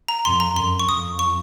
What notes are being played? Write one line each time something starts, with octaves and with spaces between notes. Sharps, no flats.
A#5
F2 C6
A#5
F#2 C6
C#6
F2 D#6
C#6